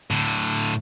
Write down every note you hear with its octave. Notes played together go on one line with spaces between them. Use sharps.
A2 D3